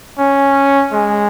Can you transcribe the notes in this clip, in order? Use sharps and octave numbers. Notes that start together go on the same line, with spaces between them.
C#4
G#3